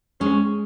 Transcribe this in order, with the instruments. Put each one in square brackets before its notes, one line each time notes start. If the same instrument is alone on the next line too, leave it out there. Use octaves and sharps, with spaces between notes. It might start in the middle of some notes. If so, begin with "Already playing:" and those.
[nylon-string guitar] G#3 [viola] C#4